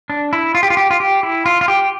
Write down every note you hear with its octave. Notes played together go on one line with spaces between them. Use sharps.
D4
E4
F4
G4
F4
G4
F4
G4
E4
F4
F4
G4